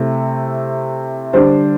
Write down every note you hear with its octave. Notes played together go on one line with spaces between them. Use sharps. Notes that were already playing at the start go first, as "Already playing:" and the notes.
Already playing: C3 A3 E4
D3 G3 D4 C5